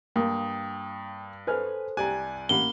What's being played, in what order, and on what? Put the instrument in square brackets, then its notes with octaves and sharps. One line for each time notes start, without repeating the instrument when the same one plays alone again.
[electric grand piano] G2 [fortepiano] A#3 [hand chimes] G5 D#6
[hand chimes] A4 C5 [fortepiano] B4 G#5 F6
[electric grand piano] C2 D5 G#5 [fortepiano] G4 A#5 [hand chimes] F#6
[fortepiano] A1 F#5 [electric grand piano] A#3 B5 [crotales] G7